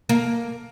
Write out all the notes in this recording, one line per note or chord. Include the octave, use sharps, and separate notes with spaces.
A#3